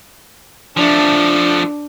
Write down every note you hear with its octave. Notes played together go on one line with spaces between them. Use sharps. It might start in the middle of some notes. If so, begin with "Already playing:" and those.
F3 A3 D4